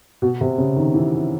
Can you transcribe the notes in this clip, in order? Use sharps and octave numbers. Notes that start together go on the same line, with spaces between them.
B2
C3
C#3
D#3
E3